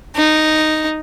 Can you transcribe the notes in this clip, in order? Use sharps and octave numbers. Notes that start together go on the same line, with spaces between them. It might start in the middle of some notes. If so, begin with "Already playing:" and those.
D#4